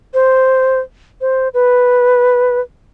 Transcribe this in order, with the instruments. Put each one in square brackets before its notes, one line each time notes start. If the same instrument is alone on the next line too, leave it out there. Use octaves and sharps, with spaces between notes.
[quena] C5
C5
B4